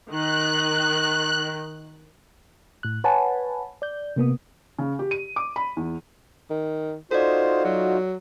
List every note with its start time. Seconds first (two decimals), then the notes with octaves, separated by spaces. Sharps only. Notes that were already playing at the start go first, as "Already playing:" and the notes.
0.10 D#3 F#6
2.83 A2 F#6
3.04 B4 C#5 F#5 G#5 A5 B5
3.82 D5 G6
4.16 C3 A#3 B3 D#6
4.78 C#3
4.99 G4
5.11 D#7
5.36 D6
5.56 B5
5.77 E2
6.50 D#3
7.11 D#4 F4 F#4 A4 C5 D5
7.64 F#3